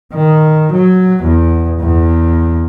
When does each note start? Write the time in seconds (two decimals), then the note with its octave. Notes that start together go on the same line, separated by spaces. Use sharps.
0.13 D#3
0.72 F#3
1.23 E2
1.80 E2